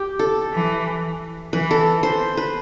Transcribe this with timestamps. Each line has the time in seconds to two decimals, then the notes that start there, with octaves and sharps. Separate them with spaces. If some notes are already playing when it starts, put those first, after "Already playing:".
Already playing: G4
0.19 A4
0.53 E3
1.53 E3 B4
1.71 A4
2.03 C5
2.37 B4